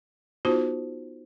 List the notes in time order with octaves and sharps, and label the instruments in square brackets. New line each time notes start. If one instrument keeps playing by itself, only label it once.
[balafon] B3 D#4 F4 F#4 C5